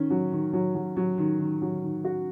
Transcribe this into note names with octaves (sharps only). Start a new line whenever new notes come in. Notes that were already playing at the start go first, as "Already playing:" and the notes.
Already playing: D#3 C#4
F#3
D#3
F#3
F#3
F#3
D#3
D#3
F#3
D#3
F#4